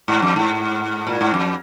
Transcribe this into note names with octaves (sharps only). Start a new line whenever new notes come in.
G#2
F2
G#2
A#2
G#2
F2